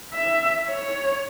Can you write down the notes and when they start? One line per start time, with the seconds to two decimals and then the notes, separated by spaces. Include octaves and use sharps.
0.14 E5
0.69 C#5